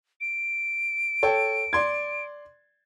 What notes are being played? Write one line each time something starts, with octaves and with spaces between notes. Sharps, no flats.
D7
A4 C#5 G5
D5 C6 G#6